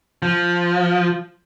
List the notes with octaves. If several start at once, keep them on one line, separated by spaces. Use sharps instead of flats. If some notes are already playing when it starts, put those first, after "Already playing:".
F3